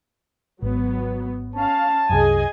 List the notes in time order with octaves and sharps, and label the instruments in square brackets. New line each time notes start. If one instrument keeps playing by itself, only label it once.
[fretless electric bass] G#1 [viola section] F#3 B3
[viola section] C#4 F5 [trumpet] A5
[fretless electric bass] C2 F#2 [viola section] G#4 D#5 G#5